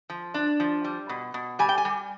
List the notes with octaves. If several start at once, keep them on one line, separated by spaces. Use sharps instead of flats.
F3
D4
F3
G3
B2
B2
G3 G#5
G5
G#5
G3